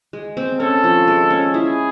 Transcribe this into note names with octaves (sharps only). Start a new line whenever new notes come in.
G#3
C4
C#4 A4
F3
G#3
C#4
E4 G#4